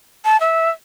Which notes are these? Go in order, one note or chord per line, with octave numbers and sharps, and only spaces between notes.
A5
E5